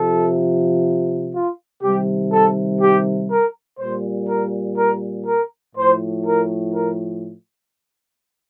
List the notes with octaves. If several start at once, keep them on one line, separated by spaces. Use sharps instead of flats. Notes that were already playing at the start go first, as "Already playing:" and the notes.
Already playing: C3 F3 A4
F4
C3 D#3 G3 G4
A4
G4
A#4
A#2 G3 C5
A#4
A#4
A#4
A2 F3 C5
A#4
A#4